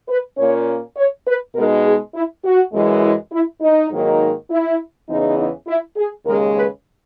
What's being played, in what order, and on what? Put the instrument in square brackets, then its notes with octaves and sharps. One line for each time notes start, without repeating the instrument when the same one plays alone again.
[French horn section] B4
A#2 A#3 C#4 C#5
C#5
B4
B2 G#3 D#4 A#4
G#4
E4
F#4
F#2 E3 G#3
E4
E4
D#4
G#2 D#3 F#3 A#3 D#4
E4
E2 C#3 E3 B3 D#4
D#4
E4
G#4
D#2 C#3 G#3 A#4
B4